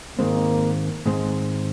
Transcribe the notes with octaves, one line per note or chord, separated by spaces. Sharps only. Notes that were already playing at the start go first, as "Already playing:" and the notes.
G#2 D#3 G#3 A#3 C4
G#2 D#3 G#3 C4